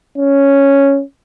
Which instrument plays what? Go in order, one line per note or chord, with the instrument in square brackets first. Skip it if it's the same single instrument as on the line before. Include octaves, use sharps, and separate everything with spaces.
[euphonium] C#4